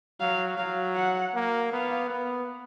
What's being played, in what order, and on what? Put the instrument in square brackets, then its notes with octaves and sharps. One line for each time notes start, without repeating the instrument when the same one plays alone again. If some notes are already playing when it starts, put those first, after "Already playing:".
[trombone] F#3 [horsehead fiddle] F5
[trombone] F#3 [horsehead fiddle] F5
[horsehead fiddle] F#5
[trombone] A#3
[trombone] B3 [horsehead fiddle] F5
[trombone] B3